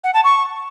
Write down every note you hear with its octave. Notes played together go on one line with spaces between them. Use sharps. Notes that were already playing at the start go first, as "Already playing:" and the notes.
F#5
A5
C#6